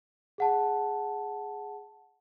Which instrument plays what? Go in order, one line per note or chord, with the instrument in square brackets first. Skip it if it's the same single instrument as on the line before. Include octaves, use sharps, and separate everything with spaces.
[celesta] G#4 F#5 A5